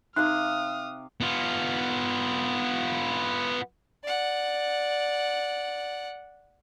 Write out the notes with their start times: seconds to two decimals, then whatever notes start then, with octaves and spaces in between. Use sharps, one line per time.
0.16 C3 D#4 F5 D6 D#6 F6 F#6
1.21 B3 F4
4.04 D5 F#5